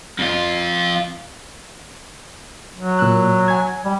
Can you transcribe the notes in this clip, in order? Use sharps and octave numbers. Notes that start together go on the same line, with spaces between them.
F2 F4
F#3
A#2 E6 F#6
G#5 G#6
G3